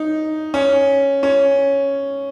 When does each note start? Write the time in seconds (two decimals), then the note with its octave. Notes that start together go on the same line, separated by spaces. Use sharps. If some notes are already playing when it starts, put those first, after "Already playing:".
Already playing: D#4
0.54 C#4
1.23 C#4